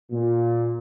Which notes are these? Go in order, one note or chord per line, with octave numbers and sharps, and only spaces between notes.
A#2